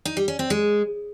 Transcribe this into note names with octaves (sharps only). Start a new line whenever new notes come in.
D#4
G3
C#4
C4
G#3